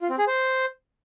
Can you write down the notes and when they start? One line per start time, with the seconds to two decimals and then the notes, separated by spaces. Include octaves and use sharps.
0.01 F4
0.10 C4
0.18 G#4
0.27 C5